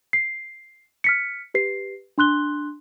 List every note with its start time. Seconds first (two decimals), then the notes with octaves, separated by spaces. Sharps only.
0.13 C7
1.04 F6 B6 C#7
1.54 G4 B4 C7
2.18 D4 C6 F#6 G7